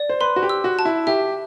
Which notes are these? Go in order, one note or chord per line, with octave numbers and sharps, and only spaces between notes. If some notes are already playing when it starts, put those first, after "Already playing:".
Already playing: D5
C5
B4 C6
F#4
G4
E6
F#4
A5
E4
G4 E5